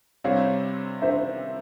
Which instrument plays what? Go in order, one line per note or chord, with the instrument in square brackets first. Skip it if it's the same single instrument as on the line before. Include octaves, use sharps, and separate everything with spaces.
[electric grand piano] C3 G3 C4 E4 [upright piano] C#5 F5
[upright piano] C5 E5